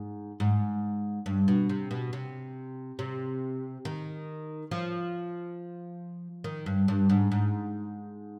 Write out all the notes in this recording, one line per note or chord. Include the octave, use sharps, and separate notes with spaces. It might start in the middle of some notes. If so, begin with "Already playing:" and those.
Already playing: G#2
G#2
G2
B2
C3
B2
C3
C3
D#3
F3
D#3
G2
G2
G#2
G#2